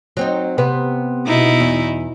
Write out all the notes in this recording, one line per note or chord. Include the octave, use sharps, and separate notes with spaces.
F#3 C4 D#4
C3 B3 B4
B2 D#4 E4
E2